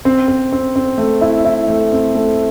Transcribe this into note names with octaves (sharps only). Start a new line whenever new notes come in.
C4
C4
C4
C4
A3
E4
E4
A3
C4
A3